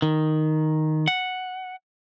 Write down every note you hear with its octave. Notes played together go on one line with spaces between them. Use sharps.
D#3
F#5